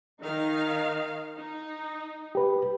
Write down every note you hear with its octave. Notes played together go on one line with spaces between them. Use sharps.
D#3 D#4 F5
D#4
G4 B4